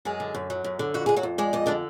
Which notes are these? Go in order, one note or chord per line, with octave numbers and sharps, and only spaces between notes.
F#2 G#3 G#4
D3
F#2
F#3
F#2
D3
F2 F#4
D3 G#4
F#3 F#4
F2
G#3 D5
F2 D#5
D3 D4 D5